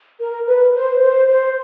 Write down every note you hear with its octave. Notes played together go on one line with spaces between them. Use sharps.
A#4
B4
C5
C5
C5